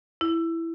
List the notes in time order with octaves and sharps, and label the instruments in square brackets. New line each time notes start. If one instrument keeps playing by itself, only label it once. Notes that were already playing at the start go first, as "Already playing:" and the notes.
[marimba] E4